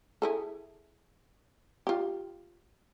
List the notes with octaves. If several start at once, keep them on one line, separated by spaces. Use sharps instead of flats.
E4 G#4 A4
F4 G4